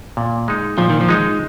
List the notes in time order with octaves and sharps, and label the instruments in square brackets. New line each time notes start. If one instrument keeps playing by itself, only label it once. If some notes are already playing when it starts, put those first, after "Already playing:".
[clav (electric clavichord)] A#2
G#3 D#4
[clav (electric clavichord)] A#2 [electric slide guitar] F3
[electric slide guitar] D#3
F3
[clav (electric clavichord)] G#3 D#4